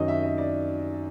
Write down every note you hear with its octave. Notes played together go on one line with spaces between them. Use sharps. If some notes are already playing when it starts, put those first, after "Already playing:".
Already playing: F#2 D#3 F#3 D#5
E5
D#5
D5